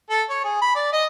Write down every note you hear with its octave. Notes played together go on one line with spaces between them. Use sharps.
A4
C#5
G#4
B5
D5
D#5